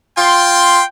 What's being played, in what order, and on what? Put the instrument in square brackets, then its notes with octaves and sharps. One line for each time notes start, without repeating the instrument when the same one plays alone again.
[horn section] F4 G5 C6